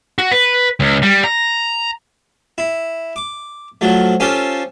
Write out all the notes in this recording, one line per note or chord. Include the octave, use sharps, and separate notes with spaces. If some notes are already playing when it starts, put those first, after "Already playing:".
F#4
B4
C#2
G3
A#5
E4
D6
F3 F#3 A3
C#4 F4 G4 A4 C5